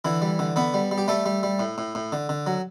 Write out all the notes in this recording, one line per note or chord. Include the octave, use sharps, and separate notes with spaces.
D3 E3 E4
G3
D3
D3 B3 B4
G3
G3
G4
G3 A3 A4
G3
G3
A2
A2
A2
D3
D3
F#3